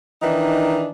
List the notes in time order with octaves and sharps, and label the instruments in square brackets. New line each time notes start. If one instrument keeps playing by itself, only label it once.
[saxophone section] D#3 E3 D4 D#4